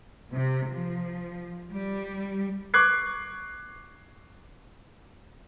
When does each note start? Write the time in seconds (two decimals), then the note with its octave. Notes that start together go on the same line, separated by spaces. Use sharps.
0.32 C3
0.71 F3
1.71 G3
2.74 C#6 D6 F#6 G#6 C7